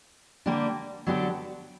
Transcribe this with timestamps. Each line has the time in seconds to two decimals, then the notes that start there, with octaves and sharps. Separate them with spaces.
0.46 D3 G3 A#3 D4 G4
1.07 D3 F#3 B3 D4 G4